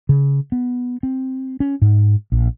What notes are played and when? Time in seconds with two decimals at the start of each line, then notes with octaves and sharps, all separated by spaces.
0.09 C#3
0.52 B3
1.03 C4
1.60 C#4
1.82 G#2
2.32 A#1